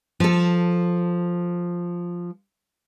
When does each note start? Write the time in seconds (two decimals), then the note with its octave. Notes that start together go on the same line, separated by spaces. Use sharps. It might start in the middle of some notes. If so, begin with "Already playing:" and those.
0.20 F3 A4